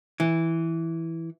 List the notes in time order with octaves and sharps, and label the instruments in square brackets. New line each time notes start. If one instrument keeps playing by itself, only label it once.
[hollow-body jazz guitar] E3